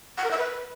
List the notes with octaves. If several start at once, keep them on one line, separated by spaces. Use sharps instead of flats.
F#5
A#4
E5
B4